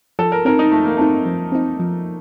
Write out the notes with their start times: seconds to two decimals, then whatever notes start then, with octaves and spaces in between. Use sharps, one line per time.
0.19 F3 A4
0.32 A#4
0.45 C4 D#4 A#4
0.59 D#4
0.72 F3 A3
0.85 A#3
0.97 A3 C4 D#4
1.26 F3
1.52 C4 D#4
1.80 F3